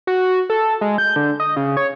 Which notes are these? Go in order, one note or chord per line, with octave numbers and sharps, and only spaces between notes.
F#4
A4
G#3
G6
D3
D#5
C#3
C#5